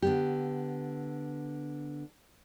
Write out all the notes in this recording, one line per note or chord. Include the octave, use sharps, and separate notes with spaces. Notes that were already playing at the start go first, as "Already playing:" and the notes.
D3 B3 G4